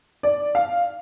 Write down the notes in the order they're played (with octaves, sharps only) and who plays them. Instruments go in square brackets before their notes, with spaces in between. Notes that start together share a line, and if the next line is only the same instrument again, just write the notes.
[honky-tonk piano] D5
F5